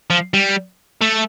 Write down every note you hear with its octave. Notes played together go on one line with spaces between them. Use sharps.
F3
G3
A3